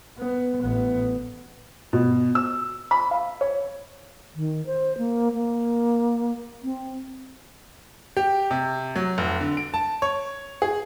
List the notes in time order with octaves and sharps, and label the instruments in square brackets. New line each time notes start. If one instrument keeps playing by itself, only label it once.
[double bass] B3
A1 B3
[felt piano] B2
E6
B5
F5
C#5
[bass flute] D#3
C5
A#3
A#3
C4
[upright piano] G4
C3
F#3
F1
D3
D7
A5
C#5
G#4